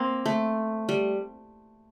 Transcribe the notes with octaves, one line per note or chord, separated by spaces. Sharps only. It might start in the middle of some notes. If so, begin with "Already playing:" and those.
Already playing: A#3 C4
A3
G3